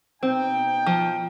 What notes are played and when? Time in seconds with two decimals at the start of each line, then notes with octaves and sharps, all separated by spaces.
0.23 B2 C4 D#4 G5
0.87 F3